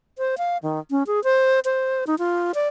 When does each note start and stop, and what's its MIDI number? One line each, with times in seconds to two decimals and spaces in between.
0.18 0.35 72
0.38 0.58 77
0.63 0.80 51
0.91 1.03 61
1.07 1.23 68
1.24 1.60 72
1.65 2.04 72
2.07 2.15 63
2.19 2.52 65
2.55 2.68 74